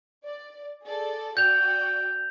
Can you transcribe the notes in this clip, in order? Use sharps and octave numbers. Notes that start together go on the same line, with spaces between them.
D5
G#4 A4 D5
F#4 D5 G5 G6 F7